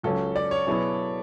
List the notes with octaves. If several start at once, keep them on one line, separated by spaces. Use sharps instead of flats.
C#2 C#3 F#3 C#4 A4
D5
C#5
B2 F#3 B3 E4 G#4